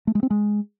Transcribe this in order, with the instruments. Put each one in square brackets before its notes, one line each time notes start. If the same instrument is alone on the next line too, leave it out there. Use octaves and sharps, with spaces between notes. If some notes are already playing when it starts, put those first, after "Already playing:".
[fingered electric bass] A3
G#3
C4
G#3